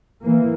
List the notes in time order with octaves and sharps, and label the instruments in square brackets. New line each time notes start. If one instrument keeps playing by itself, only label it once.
[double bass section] E3 A#3